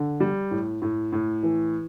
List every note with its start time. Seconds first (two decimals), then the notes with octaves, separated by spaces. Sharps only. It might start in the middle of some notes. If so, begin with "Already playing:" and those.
Already playing: D3
0.20 G3
0.51 A2
0.82 A2
1.12 A2
1.43 E3